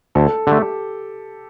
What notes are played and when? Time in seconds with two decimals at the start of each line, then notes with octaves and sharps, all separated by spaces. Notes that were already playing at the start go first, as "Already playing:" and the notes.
0.15 D2 A4
0.47 D3 A3 G4